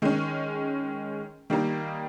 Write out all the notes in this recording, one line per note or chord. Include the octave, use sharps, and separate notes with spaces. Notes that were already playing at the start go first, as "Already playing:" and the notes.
D#3 G#3 C#4
D#3 G3 A#3 D#4